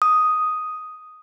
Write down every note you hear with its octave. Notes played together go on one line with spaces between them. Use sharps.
D#6